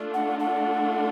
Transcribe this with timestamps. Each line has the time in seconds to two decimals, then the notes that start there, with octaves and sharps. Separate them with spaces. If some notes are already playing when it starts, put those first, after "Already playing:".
Already playing: A3 D4 F4
0.14 F#5
0.40 F#5